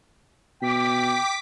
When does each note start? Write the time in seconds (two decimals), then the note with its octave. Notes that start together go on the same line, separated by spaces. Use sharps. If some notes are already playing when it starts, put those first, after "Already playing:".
0.62 B2 G5 D6 B6